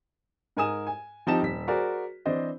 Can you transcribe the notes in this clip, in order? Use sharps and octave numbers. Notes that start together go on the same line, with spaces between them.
G#2 A#4 G#5 D#6 E7
G#5
F3 C4 D#4 G4 A5 E7
D#1 B6
F#4 G#4 A#4 C5 D5
E3 C4 D4 C5 D#5